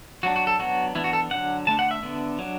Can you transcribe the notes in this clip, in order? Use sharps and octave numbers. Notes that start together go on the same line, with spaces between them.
F#3 D4 F#4
F#4
A4
F#3 B3 D4 F#4
E3 B3 D4 E4
F#4
A4
D3 F#3 D4 F#5
D3 A3 D4 A5
F#5
E5
D3 B3 D4
F#3 D4